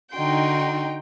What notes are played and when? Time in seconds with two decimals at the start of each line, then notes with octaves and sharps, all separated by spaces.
0.14 D3 D#4 F#4 G5 C6